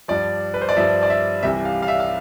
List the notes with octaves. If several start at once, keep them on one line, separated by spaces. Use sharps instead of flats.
G2 F3 D5
B4
C5
D5
G2 F3 E5
D5
E5
C2 C3 E3 E5
F5
F5
E5
F5